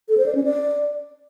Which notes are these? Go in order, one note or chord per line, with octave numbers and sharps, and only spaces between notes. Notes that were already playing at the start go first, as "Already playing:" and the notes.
A4
C5
D5
C#4
D5